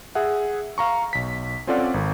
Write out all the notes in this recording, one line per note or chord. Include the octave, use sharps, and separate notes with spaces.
G#4 E5 F#5
F5 A#5 C#6
B1 B6
C4 C#4 F4 A4 D5 F#5
G#1